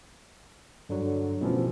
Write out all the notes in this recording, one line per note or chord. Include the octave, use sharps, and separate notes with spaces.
G2 D3 F#3
A1 B2 E3 F3